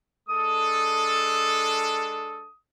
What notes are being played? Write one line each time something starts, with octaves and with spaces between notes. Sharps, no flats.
G#3 D4 A4 D#6